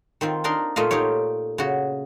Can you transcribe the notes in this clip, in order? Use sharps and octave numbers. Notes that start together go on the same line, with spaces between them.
D#3 C4 F4
D4 D#4 A#4 C6
A#2 A3 F4 D#5 F5
D#4 F4 G4 C#5
C#3 F#4